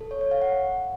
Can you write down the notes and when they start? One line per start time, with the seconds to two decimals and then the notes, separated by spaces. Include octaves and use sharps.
0.01 A4
0.11 C#5
0.21 C#5
0.31 F5
0.42 F#5